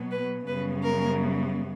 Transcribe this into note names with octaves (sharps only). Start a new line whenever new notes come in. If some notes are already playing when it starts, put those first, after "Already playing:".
Already playing: B2 F#3 B3
B4
F#2 C#3 G3 B3 B4
A#4